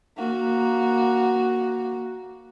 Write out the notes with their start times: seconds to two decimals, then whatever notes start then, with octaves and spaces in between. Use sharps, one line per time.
0.17 A#3 F#4